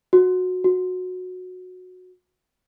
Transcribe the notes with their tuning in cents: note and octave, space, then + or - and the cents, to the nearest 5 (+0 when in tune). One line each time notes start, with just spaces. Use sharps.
F#4 -15
F#4 -15